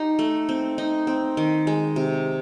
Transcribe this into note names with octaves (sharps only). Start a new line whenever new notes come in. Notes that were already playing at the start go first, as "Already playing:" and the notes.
Already playing: D#4 G4
A3
C4
D#4
C4
D#3
G#3
C3